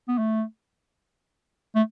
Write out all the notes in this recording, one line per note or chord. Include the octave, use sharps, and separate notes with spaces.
B3
A3
A3